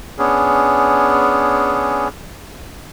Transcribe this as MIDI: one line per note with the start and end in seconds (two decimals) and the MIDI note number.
0.18 2.08 59
0.18 2.08 61
0.18 2.08 62
0.18 2.08 68